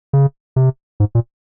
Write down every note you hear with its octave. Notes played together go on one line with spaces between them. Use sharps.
C#3
C3
G#2
A#2